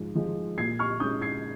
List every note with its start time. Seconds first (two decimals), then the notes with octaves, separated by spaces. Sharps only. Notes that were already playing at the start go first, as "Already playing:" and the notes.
Already playing: G#2 F3 G#3
0.15 F3 G#3
0.58 A#2 G#6 C7
0.79 C#6 F6
1.00 G#3 C#4 D#6 G6
1.22 G#6 C7